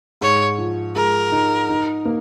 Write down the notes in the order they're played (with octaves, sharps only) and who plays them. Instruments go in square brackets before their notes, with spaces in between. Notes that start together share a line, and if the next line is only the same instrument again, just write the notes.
[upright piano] G#2 [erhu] C#5
[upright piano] F3
[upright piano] G#3 [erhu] A#4
[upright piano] D#4
D#4
A#3